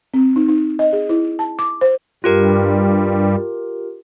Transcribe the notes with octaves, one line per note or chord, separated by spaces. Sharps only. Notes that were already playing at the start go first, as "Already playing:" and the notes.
C4
D#4
D#4
D#5
G#4
E4
A5
D6
C5
G2 G3 F4 G4 A#4